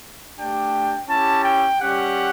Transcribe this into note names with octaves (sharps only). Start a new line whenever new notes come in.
A3 D4 G4 G5
C#4 E4 G4 A5
G5
G3 C#4 G4 F#5